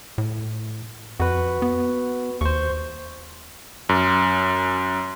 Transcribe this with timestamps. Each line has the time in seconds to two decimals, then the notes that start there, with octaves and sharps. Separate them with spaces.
0.18 A2
1.20 F2 F#4 B4
1.62 B3
2.41 D#2 C5 C#6
3.89 F#2